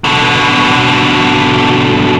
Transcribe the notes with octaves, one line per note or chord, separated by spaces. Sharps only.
B2 D3